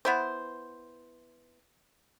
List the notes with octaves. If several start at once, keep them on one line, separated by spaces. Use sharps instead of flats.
B3 E4 C5